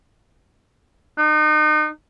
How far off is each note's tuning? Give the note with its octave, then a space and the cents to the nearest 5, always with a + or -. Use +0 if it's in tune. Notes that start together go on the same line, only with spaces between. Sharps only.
D#4 -35